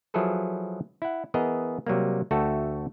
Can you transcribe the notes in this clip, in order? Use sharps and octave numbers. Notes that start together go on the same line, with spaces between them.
F3 F#3 E4 G#4 A4 B4
E4 F#5
E3 B3 G#4 A#4 D#5
C3 F#3 G3 A#3
D2 A3 F#4 A4 G5 A5